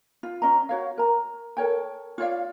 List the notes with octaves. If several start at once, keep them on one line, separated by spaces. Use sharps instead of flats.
F4
C#4 D#5 A#5
F#4 C#5 F5
A#4 A#5
A4 A#4 C#5 G5
F4 C#5 D5 F5